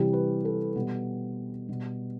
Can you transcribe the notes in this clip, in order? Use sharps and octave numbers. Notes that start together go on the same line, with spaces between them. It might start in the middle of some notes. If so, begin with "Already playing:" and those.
Already playing: C3 E3 G3 G4
B4
A4
B2 G3 B3
B2 G3